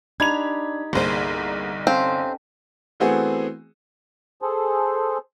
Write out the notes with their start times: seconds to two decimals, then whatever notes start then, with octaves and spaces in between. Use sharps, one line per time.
0.20 D4 D#4 G4 B5 G#6 F7
0.93 G1 C2 A#3 G#4 C5
1.87 C4 C#4 A4 F5
3.00 E3 A3 B3 C4 F#4 G#4
4.42 G#4 A4 C5